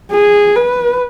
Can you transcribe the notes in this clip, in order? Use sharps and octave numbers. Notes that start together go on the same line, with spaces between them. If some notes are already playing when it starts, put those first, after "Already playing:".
G#4
B4